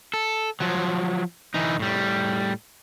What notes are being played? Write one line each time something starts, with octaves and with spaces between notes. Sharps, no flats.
A4
F3 F#3
E3 D#4
A2 G3